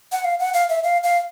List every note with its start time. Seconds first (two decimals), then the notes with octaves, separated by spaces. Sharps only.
0.12 F#5
0.24 F5
0.39 F#5
0.54 F5
0.69 E5
0.84 F5
1.04 F5